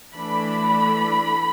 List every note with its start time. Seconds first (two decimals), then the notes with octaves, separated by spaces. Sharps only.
0.14 E3 A3 D4 B5